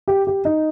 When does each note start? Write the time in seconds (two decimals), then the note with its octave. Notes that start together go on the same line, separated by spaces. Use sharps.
0.08 G4
0.27 G4
0.45 D#4